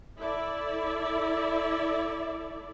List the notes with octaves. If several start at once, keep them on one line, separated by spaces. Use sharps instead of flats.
E4 A4 D5 E5